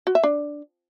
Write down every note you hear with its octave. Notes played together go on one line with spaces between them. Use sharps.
F#4
E5
D4